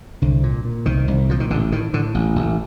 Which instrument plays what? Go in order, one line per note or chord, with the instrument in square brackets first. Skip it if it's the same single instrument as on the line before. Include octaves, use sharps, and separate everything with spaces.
[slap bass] C2 D3
A#2
A#2
C2 D#3
C2
A#2 F3
D#3
A1 D3
A2 D#3
A2 D3
A1
A1